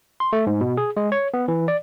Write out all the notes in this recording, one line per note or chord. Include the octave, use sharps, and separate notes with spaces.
C6
A3
G#2
B2
G#4
G#3
C#5
B3
E3
D5